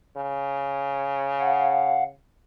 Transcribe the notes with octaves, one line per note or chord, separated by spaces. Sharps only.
C#3
F5 F#5